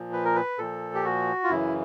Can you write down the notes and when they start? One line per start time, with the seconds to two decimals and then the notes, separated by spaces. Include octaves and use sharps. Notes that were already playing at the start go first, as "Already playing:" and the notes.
Already playing: A#2 F3
0.13 B4
0.25 A#4
0.35 B4
0.58 A#2 F3 A4
0.94 G4
1.04 F#4
1.44 F4
1.50 F#2 C#3 E3 E4